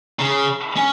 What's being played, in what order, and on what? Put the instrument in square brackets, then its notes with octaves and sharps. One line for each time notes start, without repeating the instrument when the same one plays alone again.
[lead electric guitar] C#3
C#4